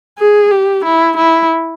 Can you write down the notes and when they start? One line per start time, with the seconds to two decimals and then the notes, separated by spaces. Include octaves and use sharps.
0.18 G#4
0.51 G4
0.85 E4
1.17 E4